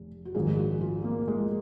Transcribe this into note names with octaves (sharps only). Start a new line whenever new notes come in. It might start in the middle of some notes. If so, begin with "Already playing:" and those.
Already playing: F1
F#4
A#1 G#2 D#3 G#4
F#4
F4
A#3
G#3